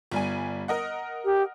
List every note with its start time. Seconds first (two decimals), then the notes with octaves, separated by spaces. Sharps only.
0.11 G1 G3 G#5
0.68 A#4 D#5 F#5
1.25 G4